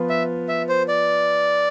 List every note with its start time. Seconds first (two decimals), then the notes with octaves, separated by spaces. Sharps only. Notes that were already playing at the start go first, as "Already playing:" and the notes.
Already playing: F3 B3 F4 B4
0.09 E5
0.49 E5
0.69 C5
0.88 D5